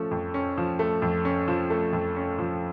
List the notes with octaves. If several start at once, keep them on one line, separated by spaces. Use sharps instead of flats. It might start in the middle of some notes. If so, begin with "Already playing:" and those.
Already playing: F3 A3 C#4
F2
C#4
F3
A3
F2
C#4
F3
A3
F2
C#4
F3